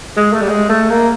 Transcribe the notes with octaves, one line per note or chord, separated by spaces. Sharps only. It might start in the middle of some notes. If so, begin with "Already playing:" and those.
G#3
A3
G3
G#3
A3
A#3